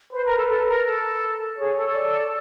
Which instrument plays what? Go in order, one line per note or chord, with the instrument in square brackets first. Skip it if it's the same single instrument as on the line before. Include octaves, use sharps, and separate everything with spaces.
[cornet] B4 [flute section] C5
[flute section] A#4
A4
A4
A#4
A4
A4
[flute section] G#4 [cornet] C#5
[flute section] A4
[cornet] D5